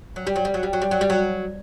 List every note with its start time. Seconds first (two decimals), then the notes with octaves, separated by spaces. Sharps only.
0.16 F#3
0.27 G3
0.36 F#3
0.45 G3
0.54 F#3
0.63 G3
0.73 F#3
0.82 G3
0.91 F#3
1.01 G3
1.10 F#3